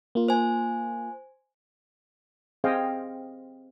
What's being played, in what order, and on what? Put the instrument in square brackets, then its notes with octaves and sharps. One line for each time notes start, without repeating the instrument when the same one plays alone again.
[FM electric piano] A#3 F4
[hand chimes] C5 G#5
[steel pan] C4 G#4 C5 D#5 F5 G5